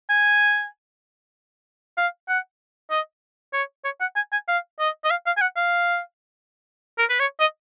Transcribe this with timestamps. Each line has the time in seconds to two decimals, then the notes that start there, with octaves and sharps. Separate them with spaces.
0.09 G#5
1.98 F5
2.29 F#5
2.90 D#5
3.53 C#5
3.84 C#5
4.00 F#5
4.16 G#5
4.32 G#5
4.48 F5
4.80 D#5
5.04 D#5
5.10 F5
5.26 F5
5.37 G#5
5.41 F#5
5.57 F5
6.98 A#4
7.10 B4
7.20 C#5
7.40 D#5